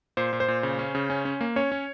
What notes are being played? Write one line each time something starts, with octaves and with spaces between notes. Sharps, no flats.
A#2 C5
A#2
C5
A#2
C#3
C#4
C#3
C#4
C#4
A#3
C#4 C#5
C#4